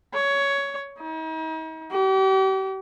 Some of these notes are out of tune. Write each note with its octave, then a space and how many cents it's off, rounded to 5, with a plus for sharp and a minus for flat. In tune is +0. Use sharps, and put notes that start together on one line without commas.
C#5 +15
D#4 +45
G4 -40